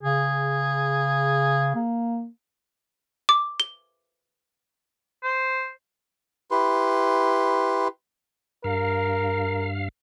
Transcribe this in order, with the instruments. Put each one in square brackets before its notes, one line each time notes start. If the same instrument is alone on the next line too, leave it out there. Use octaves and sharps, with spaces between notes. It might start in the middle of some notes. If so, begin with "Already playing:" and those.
[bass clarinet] C#3 [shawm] G#4
[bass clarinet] A#3
[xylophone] D6
G7
[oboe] C5
[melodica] E4 G4 B4 C6
[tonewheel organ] G2 F5 [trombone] A#4